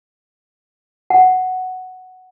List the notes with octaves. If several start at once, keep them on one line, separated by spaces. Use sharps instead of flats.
F#5